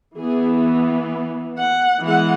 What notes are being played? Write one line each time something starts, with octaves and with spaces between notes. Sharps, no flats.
E3 B3 G#4
F#5
E3 G#3 B3 F#5